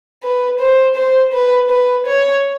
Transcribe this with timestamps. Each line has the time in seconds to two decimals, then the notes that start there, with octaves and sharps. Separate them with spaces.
0.23 B4
0.60 C5
0.96 C5
1.33 B4
1.70 B4
2.07 C#5